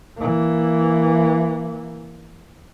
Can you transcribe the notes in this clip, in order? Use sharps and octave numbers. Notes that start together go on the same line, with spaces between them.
E3 A#3